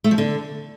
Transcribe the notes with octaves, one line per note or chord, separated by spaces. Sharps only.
A3
F3
D3